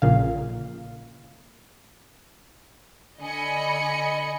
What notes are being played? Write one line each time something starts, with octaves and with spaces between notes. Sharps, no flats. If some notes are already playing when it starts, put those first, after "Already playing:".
A#1 A#2 C#3 F5
D3 D#5 G#5 B5 C#7